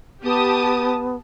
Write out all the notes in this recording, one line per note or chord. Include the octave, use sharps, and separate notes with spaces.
B3 G4 A5 D#6